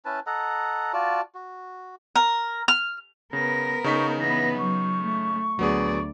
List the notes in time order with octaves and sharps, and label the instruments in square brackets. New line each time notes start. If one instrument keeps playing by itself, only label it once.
[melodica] C#4 E4 B4 A5
A4 D#5 F#5 A#5
F4 F#4 D5 A5
F#4
[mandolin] A#4
F6
[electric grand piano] C#3 [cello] B3 A#4 [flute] A#6
[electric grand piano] C#3 D#4 B6 [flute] C#6
[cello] E3 B3 [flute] A#6
[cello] F#3 [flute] C#6
[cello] A3
[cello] D2 D5 [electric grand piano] F#3 B3 G#4